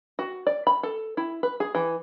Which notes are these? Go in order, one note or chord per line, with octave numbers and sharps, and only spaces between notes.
F#4
D5
B5
A4
E4
B4
G#4
E3